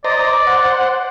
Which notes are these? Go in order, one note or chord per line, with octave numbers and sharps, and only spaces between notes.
C5 D5 D#5 A#5
C5 F#5